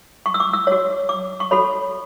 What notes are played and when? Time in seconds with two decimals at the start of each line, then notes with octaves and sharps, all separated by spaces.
0.26 C#6
0.34 E6
0.40 D6
0.53 E6
0.67 F#4 C#5
1.09 D6
1.40 C#6
1.51 F#4 A4 C#5 B5